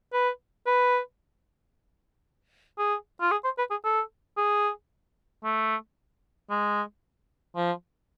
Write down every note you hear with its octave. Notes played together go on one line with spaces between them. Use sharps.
B4
B4
G#4
F4
G#4
C5
B4
G#4
A4
G#4
A3
G#3
F3